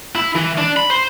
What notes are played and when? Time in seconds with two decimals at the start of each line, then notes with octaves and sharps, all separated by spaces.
0.15 E4
0.35 E3
0.58 D4
0.77 B5
0.90 C5